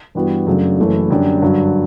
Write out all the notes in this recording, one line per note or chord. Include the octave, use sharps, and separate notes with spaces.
G2 E3 G3 B3 F#4
F#2 C#3 F#3 A3 D4
F#1 F#2 E3 A3 E4
F#2 D3 G3 D4
G2 D3 F#3